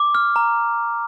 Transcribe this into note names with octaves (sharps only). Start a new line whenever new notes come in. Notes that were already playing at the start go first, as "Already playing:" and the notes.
Already playing: D6
F6
A#5